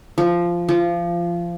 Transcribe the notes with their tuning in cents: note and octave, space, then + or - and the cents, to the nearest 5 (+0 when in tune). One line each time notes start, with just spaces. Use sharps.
F3 -10
F3 -20